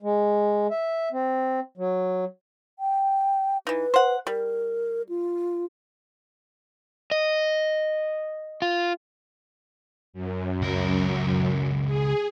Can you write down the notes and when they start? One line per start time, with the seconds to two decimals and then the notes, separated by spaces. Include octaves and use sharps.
0.02 G#3
0.71 E5
1.12 C4
1.77 F#3
2.79 G5
3.67 E3 D#4 B4
3.94 C5 F#5
4.27 G3 A#4
5.09 F4
7.11 D#5
8.62 F4
10.13 F#2
10.62 C#2 A#4
11.86 G#4